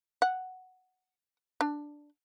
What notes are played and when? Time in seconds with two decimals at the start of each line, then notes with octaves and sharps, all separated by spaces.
0.22 F#5
1.61 D4